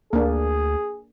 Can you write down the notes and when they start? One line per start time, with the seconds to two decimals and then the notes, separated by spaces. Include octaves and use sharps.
0.13 D2 A#3 D4 G#4